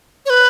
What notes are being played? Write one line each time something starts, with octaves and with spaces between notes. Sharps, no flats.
C#5
B4